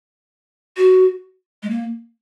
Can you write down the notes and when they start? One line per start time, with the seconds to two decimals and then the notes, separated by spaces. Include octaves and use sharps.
0.77 F#4
1.63 G#3
1.70 A#3